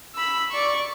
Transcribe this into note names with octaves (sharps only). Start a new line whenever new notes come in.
B5 E6
D5 C#6